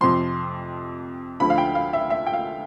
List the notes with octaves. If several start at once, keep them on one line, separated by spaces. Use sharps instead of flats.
F2 C3 F3 C6
D2 D3 F3 A3 B5
F5
G5
F5
E5
E5
G5
F5